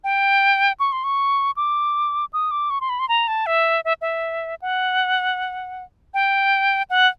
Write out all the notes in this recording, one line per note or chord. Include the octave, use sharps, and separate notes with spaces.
G5
C#6
C6
C#6
D6
D#6
D6
C#6
C6
B5
C6
A#5
A5
E5
E5
E5
F#5
G5
F#5